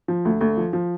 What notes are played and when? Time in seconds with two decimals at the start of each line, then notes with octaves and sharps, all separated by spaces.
0.08 F3
0.25 D2
0.41 D2
0.57 F3
0.73 F3